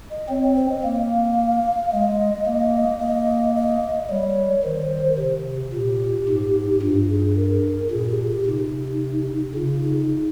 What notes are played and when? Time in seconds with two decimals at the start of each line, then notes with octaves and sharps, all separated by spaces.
0.11 D#5
0.29 C4 C#5
0.43 C#5
0.56 C5
0.69 D#5
0.83 A#3 F5
1.92 G#3 D#5
2.46 A#3
3.01 A#3 D#5
3.55 D#5
4.05 D#5
4.10 G3 C#5
4.64 D#3 C5
5.19 C3
5.73 A#2 G4
6.28 G#2
6.82 G2 F4
7.10 G#4
7.37 A#4
7.91 A#2 G#4
8.10 G4
8.27 G4
8.46 C3 D#4
9.55 C#3 F4
9.82 D#4